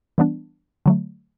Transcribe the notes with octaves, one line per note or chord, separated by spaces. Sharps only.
E3 G3 B3 D4
D3 F#3 A3